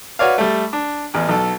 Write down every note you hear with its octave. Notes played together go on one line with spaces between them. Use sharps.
F#4 B4 C#5 D5 F5
G3 A3
D4
A1 E2
B1 A4